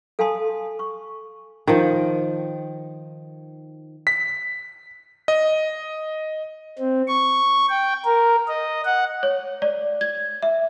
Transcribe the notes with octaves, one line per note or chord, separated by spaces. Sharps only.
A4 F5 G#5 A5 C6 D#6
C#6
D#3 F3
B6
D#5
C4
C#6
G5
A#4
D#5
F#5
C#5
D5
G#6
E5